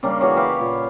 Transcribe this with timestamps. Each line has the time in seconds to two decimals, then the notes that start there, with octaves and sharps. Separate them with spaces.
0.03 C#3 G3 A#3 D4
0.21 E3 F#4 G#4 C#5
0.36 G4 B4 F5
0.59 A#2